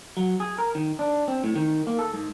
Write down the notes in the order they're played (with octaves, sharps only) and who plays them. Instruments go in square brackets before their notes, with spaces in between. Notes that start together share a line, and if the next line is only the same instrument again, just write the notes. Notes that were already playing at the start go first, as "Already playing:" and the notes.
[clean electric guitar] F#3
G#4
A#4
D#3
D4
C4
A2
D#3
A#3
A4
G#2